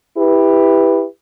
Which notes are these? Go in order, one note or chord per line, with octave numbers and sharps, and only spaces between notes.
E4 G4 B4